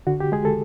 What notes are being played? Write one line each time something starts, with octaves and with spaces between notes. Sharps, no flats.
D3 F#4
G4
G#3 G#4
A4